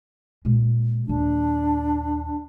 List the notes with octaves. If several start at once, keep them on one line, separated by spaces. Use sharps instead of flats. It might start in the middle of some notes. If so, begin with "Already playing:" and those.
A#2 G#3
D#2 A#2 D4